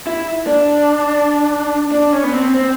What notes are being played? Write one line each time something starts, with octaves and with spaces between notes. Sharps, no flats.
E4
D4
D4
C#4
B3
C4
C4